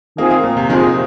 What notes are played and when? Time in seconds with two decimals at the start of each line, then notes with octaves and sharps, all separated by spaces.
0.17 D#3 A#3 C4 F4 G#4
0.31 A#3
0.44 A#2
0.57 C3
0.69 F2 C3 D#3 F3 G#3